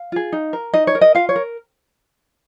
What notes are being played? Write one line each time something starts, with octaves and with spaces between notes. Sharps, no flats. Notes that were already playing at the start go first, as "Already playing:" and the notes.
Already playing: F5
F4 G#4
D#4
A#4
D#4 D#5
C#5
A#4
D#5
F4 F5
C#5
A#4